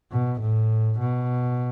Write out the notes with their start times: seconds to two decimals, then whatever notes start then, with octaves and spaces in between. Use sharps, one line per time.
0.11 B2
0.40 A2
0.99 B2